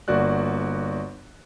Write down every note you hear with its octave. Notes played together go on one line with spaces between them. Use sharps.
G1 A#3 F#4 D5 F#6